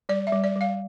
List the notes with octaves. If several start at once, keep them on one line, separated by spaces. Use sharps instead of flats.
G3 D5
E5
G3
D5
G3 F5